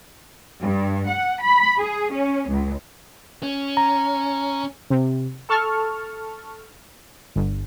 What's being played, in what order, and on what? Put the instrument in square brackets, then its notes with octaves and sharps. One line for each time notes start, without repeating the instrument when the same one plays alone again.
[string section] G2
F#5
B5
G#4
C#4
C#2
[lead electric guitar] C#4
[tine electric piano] A#5
[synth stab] C3
A4 A5 C#6 F6
G1